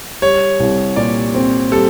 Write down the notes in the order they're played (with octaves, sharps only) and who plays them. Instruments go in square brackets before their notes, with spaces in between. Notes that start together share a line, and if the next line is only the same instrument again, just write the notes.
[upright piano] G3 [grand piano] C#5
[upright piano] C2
[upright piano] A#2 [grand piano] D5
[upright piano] C4
[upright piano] G3 [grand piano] A4